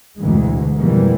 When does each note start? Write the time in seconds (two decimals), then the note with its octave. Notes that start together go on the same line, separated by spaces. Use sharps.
0.16 D2 B2 D3 E3 G#3
0.77 F2 B2 E3 G3 G#3 A#3